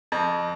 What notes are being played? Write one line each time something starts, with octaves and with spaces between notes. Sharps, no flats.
F2